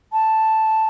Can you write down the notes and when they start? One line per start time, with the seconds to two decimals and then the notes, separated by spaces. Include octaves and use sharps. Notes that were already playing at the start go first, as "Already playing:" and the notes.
0.13 A5